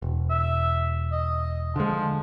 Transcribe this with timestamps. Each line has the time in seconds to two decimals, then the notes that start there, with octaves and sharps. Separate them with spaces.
0.02 E1
0.30 E5
1.12 D#5
1.76 D3 F3 G#3